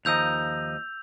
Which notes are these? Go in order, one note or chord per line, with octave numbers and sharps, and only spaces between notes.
D#2 F3 D#4 E6 G6 F7